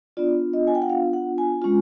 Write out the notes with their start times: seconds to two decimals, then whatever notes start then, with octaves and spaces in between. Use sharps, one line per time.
0.17 B3 D4 F4 D5
0.53 D#5
0.67 G#5
0.75 G5
0.82 F#5
0.90 F5
1.13 F#5
1.38 G#5
1.62 G#3 C#4 F4